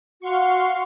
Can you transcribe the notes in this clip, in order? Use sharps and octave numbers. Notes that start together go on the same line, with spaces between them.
F#4 F5 C6 C#6